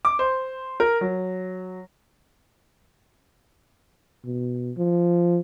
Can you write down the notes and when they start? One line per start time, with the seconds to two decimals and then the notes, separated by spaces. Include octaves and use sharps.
0.05 D6
0.19 C5
0.80 A#4
1.01 F#3
4.24 B2
4.77 F3